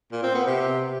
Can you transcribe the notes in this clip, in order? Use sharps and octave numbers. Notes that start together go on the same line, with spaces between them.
A#2
C4
B3
C3